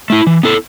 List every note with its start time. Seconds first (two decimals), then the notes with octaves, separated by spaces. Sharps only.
0.10 A3 E4
0.27 E3
0.43 B3 E4 A4